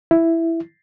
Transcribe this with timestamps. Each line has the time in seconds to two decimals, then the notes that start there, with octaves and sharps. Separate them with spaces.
0.11 E4